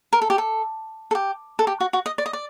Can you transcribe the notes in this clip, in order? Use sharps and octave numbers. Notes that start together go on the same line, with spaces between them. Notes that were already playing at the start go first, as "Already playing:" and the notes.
A#4
A4
G4
A4
A4
G4
A4
G4
F#4
F#4
D#5
D5
D#5
D5